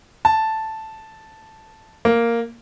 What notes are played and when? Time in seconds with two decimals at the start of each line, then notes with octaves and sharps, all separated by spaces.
0.25 A5
2.05 A#3